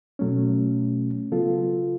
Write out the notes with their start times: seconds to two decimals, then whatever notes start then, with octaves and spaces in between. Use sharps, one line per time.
0.19 B2 F#3 A3 C#4
1.31 C#3 F#3 B3 F4 A4